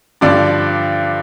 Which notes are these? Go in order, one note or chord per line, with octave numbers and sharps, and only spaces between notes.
G2 D3 F3 D4 D5